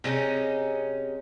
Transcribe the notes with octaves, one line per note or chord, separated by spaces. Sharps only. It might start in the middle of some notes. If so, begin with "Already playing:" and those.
C3 G#3 C#4 D#4